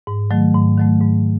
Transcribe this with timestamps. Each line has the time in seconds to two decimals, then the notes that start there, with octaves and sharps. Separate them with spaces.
0.07 G#2
0.31 D#3 F#3 A3
0.54 G#2
0.78 D#3 F#3 A3
1.01 G#2